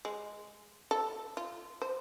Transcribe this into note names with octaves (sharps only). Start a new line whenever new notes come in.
G#3
A4
F4
C5